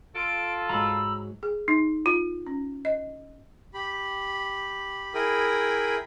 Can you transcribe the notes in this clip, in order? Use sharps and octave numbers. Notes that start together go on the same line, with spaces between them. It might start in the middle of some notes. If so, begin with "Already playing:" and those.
F4 A4 D7
G#2 F#3 A#5 B5 E6
G#4
D#4
F4
C#4
D#5
G4 B5
E4 G#4 A#4 G5 B5 D#6